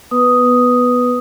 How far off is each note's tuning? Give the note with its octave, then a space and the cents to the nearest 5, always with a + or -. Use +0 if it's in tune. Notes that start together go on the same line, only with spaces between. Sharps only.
B3 +0 B4 +0 D#6 +0